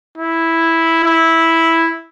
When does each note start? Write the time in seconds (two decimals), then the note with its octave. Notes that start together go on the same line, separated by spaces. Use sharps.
0.18 E4
1.04 E4